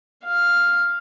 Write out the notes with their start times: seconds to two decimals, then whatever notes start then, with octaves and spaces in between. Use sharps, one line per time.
0.24 F5